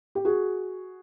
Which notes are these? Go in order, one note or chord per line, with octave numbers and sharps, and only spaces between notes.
G4
F#4 G#4